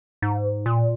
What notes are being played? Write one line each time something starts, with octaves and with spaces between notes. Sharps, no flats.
G#2
A#2